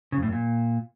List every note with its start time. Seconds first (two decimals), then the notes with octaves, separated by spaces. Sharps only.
0.12 C#3
0.17 F2
0.22 A2
0.27 F#2
0.32 A#2